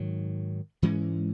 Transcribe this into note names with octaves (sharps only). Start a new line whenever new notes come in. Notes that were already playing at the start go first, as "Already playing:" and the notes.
Already playing: G#2 D#3 F#3
G#2 E3 G#3 C#4